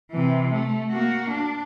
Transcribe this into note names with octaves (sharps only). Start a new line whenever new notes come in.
C3 E3
A3
A#3 F#4
D4